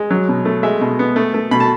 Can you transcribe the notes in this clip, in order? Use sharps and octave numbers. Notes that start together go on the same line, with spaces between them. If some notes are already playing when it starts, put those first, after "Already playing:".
Already playing: G#3
F#3
B2
A3
G#3 E5
B2
B3
A3
A3
B2 B5
A5